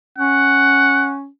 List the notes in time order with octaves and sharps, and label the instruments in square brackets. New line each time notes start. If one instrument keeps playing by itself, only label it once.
[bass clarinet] C#4 [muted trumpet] F#5